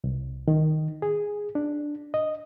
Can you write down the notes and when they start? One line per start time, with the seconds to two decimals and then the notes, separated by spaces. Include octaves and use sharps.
0.04 C2
0.48 D#3
1.02 G#4
1.55 D4
2.14 D#5